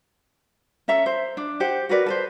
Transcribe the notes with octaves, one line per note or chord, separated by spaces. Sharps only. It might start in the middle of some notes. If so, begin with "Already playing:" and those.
C#4 A4 E5 A#5
C5
D4
G4 C5 F#5
F#4 A#4 B4 D5
A4 B4 C5